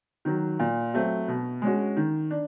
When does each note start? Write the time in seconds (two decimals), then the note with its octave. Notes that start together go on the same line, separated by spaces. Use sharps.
0.25 D#3 F#3
0.59 A#2
0.94 F#3 A3 C4
1.28 B2
1.62 G#3 C#4 F#4
1.97 D#3
2.31 D4